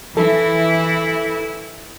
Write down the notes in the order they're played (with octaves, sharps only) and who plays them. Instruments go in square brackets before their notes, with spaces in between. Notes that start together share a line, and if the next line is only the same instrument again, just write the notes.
[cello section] E3 [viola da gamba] E4 [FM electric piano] A4